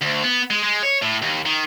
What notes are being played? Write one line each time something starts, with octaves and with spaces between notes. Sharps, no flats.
D2
B3
G#3
G#3
C#5
A2
D#2
D#3